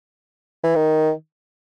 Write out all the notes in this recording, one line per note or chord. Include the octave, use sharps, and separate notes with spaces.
E3
D#3